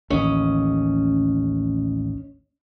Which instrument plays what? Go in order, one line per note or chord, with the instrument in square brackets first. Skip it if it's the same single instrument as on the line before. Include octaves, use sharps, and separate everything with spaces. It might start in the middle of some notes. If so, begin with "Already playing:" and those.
[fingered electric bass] A1 D#2 [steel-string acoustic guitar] C#4 D#5